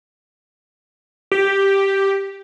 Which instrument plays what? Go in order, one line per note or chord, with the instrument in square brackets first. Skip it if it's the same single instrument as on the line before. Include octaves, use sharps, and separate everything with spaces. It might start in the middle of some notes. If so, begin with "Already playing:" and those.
[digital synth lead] G4